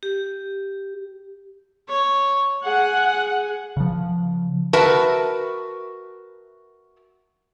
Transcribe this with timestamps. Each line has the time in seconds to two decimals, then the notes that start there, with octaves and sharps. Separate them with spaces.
0.03 G4
1.89 C#5
2.65 G#4 F#5
3.77 C#3 F3
4.73 F#4 A#4 B4 E5 A5